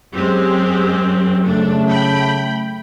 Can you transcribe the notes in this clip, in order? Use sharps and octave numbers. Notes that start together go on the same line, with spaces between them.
F#2 G#3 C4 G4
C#3 A3 D4
G5 B5